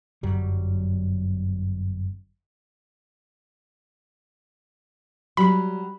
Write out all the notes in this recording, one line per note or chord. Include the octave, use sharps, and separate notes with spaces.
G1 F#2 F#3 G3
F#3 G3 B5